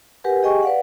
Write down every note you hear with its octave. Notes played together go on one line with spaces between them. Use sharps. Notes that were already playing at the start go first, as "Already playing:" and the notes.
G4 A#4 B4 F#5 G#5
G4 G#4 D#5 G5 G#5 C#6
B4 D5 F5 F#5